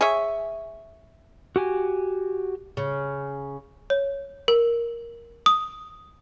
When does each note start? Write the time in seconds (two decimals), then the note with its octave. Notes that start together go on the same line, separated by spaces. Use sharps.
0.01 G#4 C#5 E5
1.56 F#4 G4 G#5
2.77 C#3
3.90 C#5
4.48 A#4
5.46 D#6